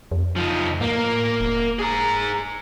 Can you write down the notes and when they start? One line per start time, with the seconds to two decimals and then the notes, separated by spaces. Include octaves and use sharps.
0.11 F2
0.36 F3 D#4
0.81 A2 A#3
1.40 E1
1.79 G#4 A#5